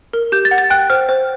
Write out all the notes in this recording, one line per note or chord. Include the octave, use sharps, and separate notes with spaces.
A#4
G4 G6
A6
F#5
A6
G5 F#6
C5 F6
C5